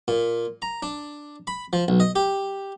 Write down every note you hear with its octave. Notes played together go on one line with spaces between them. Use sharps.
A#2
A#5
D4
B5
F3
B1
D#5
G4